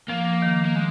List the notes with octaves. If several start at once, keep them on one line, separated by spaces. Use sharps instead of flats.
F3 A#3
D#3
A#3
G#3